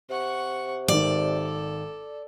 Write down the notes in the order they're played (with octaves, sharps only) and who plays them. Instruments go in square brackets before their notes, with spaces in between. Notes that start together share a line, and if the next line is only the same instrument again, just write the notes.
[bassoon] C3 [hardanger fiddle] F#5 C#6
[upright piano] G#1 D#3 [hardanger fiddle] A4 [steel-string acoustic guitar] D5